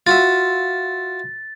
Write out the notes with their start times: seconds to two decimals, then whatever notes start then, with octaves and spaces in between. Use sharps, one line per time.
0.07 F4 F#4 E5 A6